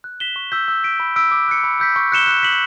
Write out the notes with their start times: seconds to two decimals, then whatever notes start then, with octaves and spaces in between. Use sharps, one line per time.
0.04 F#6
0.20 B6 E7 G7
0.36 C#6
0.52 E6 G6 B6
0.68 E6
0.84 B6 D7
1.00 B5
1.16 E6 B6 D7
1.31 D6
1.48 F#6 C#7
1.64 B5
1.80 E6 G6 B6
1.96 C#6
2.12 F#6 C#7 E7 G7
2.27 F#6
2.43 B6 F#7